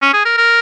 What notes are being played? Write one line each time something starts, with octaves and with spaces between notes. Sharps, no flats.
C#4
G#4
A#4
A#4